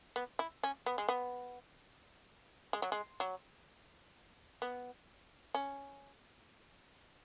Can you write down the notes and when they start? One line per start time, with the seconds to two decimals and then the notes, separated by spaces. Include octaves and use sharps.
0.16 B3
0.39 E4
0.63 C#4
0.86 B3
0.98 G#3
1.09 B3
2.73 G#3
2.82 F#3
2.92 G#3
3.20 F#3
4.62 B3
5.55 C#4